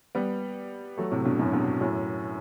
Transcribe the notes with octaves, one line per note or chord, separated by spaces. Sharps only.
G3 B3
F#3 A3
A2 C3
G2 B2
F#2 A2
G2 B2
F#2 A2